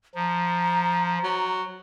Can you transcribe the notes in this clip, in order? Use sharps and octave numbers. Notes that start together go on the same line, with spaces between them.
F3 A#5
F#3